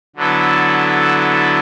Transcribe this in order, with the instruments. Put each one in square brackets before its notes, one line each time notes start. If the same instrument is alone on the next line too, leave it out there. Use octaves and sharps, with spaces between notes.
[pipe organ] D3 F#3 B3 E4 A4